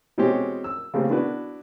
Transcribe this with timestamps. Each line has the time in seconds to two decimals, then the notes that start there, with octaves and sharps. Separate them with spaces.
0.18 B2 E3 G#3 C4 C#4 G4
0.64 E6
0.94 C#3 A3 A#3 C4 G4
1.09 B3 D4 E4 F#4 B4